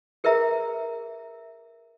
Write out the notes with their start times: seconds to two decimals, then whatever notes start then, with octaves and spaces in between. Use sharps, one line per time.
0.24 G#4 A#4 B4 E5 A#5